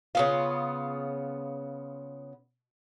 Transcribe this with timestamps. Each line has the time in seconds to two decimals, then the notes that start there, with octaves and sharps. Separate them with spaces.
0.15 C#3 B3 F4